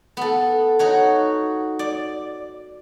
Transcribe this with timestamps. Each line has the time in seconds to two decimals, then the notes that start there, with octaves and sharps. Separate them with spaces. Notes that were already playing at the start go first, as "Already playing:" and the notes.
0.17 B3 A4
0.79 D#4 F#4 C#5
1.79 D5